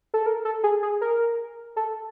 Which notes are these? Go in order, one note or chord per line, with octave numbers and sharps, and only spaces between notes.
A4
A#4
A4
G#4
G#4
A#4
A4